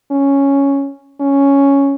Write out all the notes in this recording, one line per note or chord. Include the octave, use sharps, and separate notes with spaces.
C#4
C#4